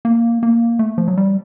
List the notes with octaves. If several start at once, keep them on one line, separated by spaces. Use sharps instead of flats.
A#3
A#3
A3
F3
F#3
G3